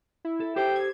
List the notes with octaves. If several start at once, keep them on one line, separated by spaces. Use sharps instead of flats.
E4
A4
G4 A4 C5 G5
G#6